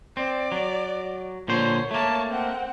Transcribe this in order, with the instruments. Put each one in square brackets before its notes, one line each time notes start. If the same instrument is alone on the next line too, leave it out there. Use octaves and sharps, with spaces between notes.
[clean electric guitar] C4 [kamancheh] D5
[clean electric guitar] F#3
[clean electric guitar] A#2 D3 C5 [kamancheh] C#5
[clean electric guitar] A3 A#3 [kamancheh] C#5 A5
[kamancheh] C4 F#5